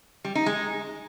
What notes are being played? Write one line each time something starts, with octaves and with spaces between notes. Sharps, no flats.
G3
D#4
G#3